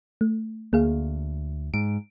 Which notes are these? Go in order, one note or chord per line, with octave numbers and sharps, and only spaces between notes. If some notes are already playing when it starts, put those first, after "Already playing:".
A3
D2 A#3 G#4 F5
G#2 D7